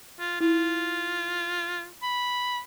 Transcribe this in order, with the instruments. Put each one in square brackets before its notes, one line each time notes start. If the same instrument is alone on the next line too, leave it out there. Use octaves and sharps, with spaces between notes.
[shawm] F4
[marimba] E4 [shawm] F4
[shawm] B5